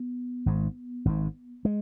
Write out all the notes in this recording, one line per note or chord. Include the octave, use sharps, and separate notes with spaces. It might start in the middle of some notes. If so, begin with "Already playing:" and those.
Already playing: B3
G#1 G#2
G#1 G#2
G#3